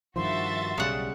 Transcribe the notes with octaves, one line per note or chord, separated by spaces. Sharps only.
G2 D#3 F3 F#4 E5 C6 A6
B1 C#3 G3 F#5